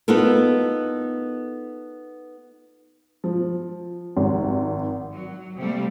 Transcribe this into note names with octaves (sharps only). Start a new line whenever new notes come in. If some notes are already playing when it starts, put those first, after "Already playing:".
B3 D#4 F4 A4 A#4
F3
G#1
F#3
C3 G3 A3 A#3